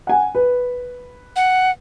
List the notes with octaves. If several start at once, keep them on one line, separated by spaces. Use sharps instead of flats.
F#5 G#5
B4
F#5